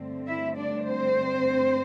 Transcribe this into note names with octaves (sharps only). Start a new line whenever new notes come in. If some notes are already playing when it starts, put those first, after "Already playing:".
Already playing: G2 D3 A3 C4
E4 E5
D4 D5
C4 C5